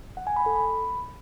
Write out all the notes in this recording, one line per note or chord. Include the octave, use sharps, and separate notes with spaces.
F#5
G#5
B5
A4
B5